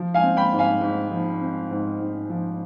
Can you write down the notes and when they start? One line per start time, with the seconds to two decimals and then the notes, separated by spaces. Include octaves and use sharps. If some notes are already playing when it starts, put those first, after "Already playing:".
Already playing: F3
0.14 F5 G#5
0.22 C4
0.37 G5 B5
0.53 G#2
0.59 F5 G#5
0.81 G#2
1.11 F3
1.41 C4
1.71 G#2
2.00 G#2
2.30 F3